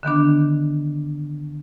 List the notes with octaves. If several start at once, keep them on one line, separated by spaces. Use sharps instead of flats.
D3 D#3 B3 D4